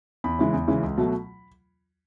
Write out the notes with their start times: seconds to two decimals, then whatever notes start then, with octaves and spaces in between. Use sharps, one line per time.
0.24 E2 B5
0.39 C#3 E3 G#3
0.53 E2
0.68 C#3 E3 G#3
0.83 C#2
0.97 B2 F#3 A3